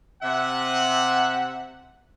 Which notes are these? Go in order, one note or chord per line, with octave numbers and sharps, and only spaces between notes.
C3 E5 F#5